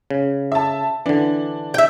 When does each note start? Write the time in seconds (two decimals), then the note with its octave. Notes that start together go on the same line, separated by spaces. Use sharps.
0.10 C#3
0.52 E5 A5
1.06 D3 E3 D4
1.74 E5 G5